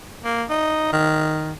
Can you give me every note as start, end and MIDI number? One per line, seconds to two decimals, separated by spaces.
0.24 0.44 58
0.50 0.89 63
0.92 1.52 51